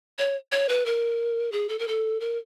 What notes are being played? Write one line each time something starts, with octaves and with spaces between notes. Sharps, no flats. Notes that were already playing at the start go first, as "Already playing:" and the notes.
C#5
C#5
B4
A#4
G#4
A4
A#4
A4
A#4